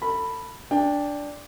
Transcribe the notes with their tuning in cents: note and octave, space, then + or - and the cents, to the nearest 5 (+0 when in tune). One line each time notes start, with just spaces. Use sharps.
A4 +35 B5 -5
D4 -5 G5 +20